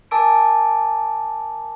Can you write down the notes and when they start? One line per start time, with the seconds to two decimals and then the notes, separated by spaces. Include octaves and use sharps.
0.11 A#4 G#5 A5 D6 E6 D7